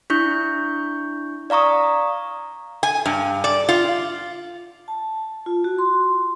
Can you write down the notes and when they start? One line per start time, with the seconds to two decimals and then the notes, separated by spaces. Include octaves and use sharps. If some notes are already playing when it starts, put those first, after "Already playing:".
0.10 D4 E4 C#6 G6
1.50 D5 F5 A#5 C#6 D#6
2.83 G#5
3.06 G2
3.44 D5
3.69 F4
4.88 A5
5.46 F4
5.64 F#4
5.78 C6